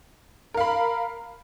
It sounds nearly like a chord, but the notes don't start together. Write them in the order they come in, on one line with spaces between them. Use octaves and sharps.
A#4 F5 B5